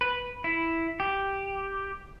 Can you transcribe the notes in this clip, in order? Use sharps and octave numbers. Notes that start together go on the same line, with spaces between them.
B4
E4
G4